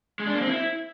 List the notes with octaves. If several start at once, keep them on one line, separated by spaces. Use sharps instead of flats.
G#3
D4
A#3
C4
E4